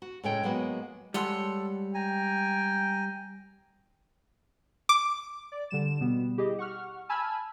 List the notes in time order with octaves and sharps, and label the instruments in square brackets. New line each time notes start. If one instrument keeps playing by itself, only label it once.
[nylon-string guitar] F#4
A2 C#3 G#3 A4 C#5 G5
F#3 G#3 A#3 B3 F#4
[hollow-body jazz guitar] G3 G#3 [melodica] A4 [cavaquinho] C#5 F#5 C6
[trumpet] G5 [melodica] G#5 A#5
[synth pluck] D6
[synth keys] D5
D3 G3 E7
B2 G3 B3
E4 G4 G#4 D#5
F#5 C#6 F6
G#5 A5 B5 E6 F6 G#6